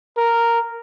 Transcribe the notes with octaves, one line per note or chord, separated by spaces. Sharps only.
A#4